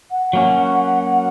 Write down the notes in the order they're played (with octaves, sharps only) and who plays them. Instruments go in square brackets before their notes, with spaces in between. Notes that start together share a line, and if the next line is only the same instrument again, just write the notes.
[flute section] F#5
[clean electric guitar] F#3 A#3 C#4